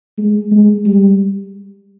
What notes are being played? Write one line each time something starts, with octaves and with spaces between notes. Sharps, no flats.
G#3
G#3
G3